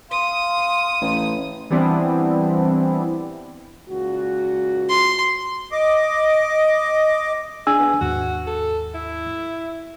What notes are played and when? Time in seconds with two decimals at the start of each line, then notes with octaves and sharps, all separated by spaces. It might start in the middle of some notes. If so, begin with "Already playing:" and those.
0.11 F5 C6 D#6
1.02 A1
1.70 E3 G3 B3 C4 D4 E4
3.89 C#2 A#2 F#4
4.89 C6
5.72 D#5 D6
7.67 D4 G#4 G#5 E6
7.80 B3
8.01 D#2 G#2 F#4
8.47 A4
8.95 E4